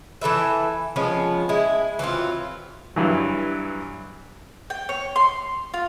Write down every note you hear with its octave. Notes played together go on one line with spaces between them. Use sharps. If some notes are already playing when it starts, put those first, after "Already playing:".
E3 A4 B4 E5
F3 G#3 B3 C#4
G#3 E4
E3 F#3 C4 F4
G2 E3 F#3
G5
C#5
C6
F4